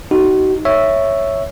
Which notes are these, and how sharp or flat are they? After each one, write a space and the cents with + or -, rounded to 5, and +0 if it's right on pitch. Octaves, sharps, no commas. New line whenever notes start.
D#4 -5 F#4 +35
C#5 +0 E5 +0